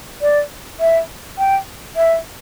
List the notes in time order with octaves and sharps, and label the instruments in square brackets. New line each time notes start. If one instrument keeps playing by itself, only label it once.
[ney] D5
E5
G5
E5